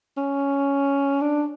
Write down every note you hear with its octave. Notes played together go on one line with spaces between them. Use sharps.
C#4
D4